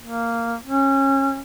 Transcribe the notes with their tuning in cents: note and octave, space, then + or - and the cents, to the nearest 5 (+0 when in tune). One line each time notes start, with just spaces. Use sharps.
A#3 -10
C#4 -25